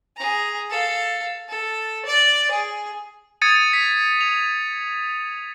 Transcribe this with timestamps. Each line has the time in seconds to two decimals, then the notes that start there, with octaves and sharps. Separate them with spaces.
0.16 G#4 A#5
0.70 A4 F5
1.48 A4
2.05 D5
2.51 G#4
3.42 D#6 G#6 A6 C#7 D#7
3.73 B6
4.21 F7